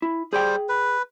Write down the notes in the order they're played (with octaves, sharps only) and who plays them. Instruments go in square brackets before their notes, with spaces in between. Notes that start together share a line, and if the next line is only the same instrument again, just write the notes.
[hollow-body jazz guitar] E4
[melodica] G3 C5 [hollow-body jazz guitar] G#4 G5
[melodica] B4